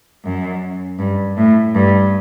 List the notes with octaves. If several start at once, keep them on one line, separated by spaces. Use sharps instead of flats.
F#2
G2
A2
G2